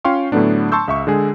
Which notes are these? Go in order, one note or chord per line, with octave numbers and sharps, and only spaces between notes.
C#4 F4 F5 G5 C6 C#6
A2 D3 F#3 A3 B3 D4
A5 C6 C#6 E6 G6
C#2 E5 C#6
D3 G#3 G#4